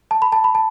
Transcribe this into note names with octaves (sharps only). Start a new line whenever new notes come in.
A5
B5
A5
B5
A5